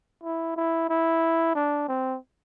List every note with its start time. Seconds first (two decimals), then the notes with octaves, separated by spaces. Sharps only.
0.24 E4
0.56 E4
0.90 E4
1.55 D4
1.88 C4